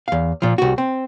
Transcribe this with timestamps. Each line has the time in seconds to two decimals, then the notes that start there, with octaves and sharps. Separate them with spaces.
0.08 E2 F5
0.42 A#2 F3
0.58 C2 F#4
0.78 C4